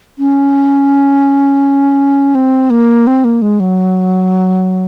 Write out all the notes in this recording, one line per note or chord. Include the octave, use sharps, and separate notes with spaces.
C#4
C4
A#3
C4
A#3
G#3
F#3